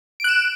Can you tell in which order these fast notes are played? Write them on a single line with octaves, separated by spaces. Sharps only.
D7 F#6 E7